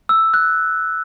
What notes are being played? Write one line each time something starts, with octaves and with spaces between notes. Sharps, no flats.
E6
F#6